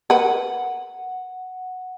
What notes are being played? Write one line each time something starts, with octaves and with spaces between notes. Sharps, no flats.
A#4 B4 F#5